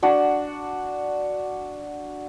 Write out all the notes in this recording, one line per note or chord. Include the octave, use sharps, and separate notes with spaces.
D4 F#4 F#5